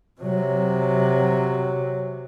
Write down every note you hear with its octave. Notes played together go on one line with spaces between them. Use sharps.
C3 F#3